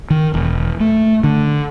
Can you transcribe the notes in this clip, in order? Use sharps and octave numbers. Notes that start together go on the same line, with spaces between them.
D#3
E1
A3
D3